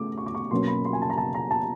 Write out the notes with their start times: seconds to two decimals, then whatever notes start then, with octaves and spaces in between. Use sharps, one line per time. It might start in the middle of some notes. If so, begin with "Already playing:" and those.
Already playing: C#3 A3 D6
0.18 C#6
0.26 D6
0.35 C#6
0.51 B2 F#3 A#3 C#4 C6
0.67 B5
0.85 C6
0.93 G#5
1.02 A5
1.10 A#5
1.18 A5
1.34 A#5
1.51 A5